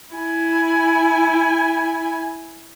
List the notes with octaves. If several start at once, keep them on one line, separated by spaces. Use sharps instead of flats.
E4 G#5